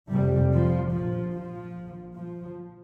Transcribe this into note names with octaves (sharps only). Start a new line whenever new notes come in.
F1 F2 C3 G3
F3
A#1 A#2 F3
F3
A#1 A#2
F3